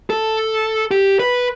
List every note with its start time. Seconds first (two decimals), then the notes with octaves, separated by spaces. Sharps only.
0.10 A4
0.91 G4
1.19 B4